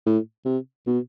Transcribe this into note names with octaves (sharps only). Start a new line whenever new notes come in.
A2
C3
B2